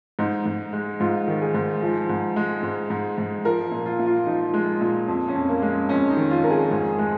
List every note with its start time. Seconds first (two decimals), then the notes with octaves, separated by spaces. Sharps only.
0.19 G#2 D#4
0.46 G#2
0.73 G#3
1.00 G#2 F4
1.28 D#3
1.42 G#4
1.54 G#2
1.82 F3
2.09 G#2
2.36 G#3
2.63 G#2
2.90 G#2
3.18 G#2
3.45 F3 A#4
3.72 A#2
3.86 F4
3.99 A#2
4.06 F4
4.26 F3 D#4
4.54 G#3
4.81 A#2
5.08 F2
5.28 C#4
5.35 F2
5.49 A#3
5.62 G#3
5.70 C#4
5.89 F2 C#4
6.10 D#4
6.17 D#3
6.31 F4
6.44 F2 A#4
6.51 G#4
6.71 G#2
6.99 G#3